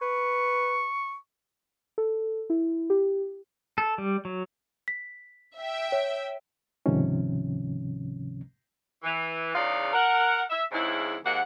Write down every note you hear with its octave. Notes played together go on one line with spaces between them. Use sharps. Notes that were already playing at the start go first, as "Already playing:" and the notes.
B4 C#6
A4
E4
G4
A4
G3
F#3
B6
E5 G5
C#5
C#2 G#2 C3 D#3 F3 C#4
E3
E2 C#3 D#4 D5 F5
A#4 F#5
E5
F2 G#2 C#3 E4
D#2 G#2 A#3 F#5